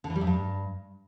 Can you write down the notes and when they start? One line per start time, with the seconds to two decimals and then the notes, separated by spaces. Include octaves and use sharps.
0.04 D3
0.10 E3
0.16 G3
0.21 F#2
0.27 G2